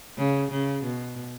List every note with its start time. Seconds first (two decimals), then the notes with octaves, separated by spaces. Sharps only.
0.18 C#3
0.51 C#3
0.84 B2